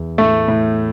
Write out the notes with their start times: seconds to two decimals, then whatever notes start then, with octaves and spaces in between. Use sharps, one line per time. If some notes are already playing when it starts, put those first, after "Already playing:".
Already playing: E2
0.18 A2 A3
0.48 A2